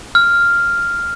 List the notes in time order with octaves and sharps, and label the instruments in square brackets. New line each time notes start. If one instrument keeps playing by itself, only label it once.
[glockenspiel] F6